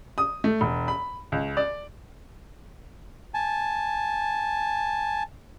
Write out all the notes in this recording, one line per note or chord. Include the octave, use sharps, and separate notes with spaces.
D#6
A3
E1
B5
C#2
D5
G#5 A5